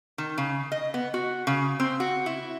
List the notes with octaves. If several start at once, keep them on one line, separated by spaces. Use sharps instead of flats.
D#3
C#3
D#5
B3
F#4
C#3
C4
F#4
E4